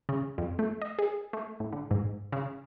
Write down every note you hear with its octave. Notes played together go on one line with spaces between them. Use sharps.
C#3
F2
A3
D#5
G#4
A3
A2
D3
G#2
C#3